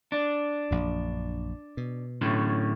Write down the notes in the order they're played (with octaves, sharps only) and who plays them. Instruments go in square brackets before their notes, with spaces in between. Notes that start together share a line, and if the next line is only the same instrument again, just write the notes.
[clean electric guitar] D4
[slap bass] A#1 F#2
B2
[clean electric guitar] A2 D3 C#4